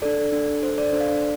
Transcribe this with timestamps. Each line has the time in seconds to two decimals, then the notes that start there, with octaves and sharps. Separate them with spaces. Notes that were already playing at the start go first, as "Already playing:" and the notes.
0.02 D4 A4 D5
0.32 D4 A4
0.63 D4 A4 C5
0.78 D5
0.92 D4 A4 C5
1.00 F5
1.08 D5